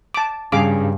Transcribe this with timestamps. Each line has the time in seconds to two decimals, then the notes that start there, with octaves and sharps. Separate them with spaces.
0.14 A5 D6
0.52 G2 C#3 G#4 F5 D6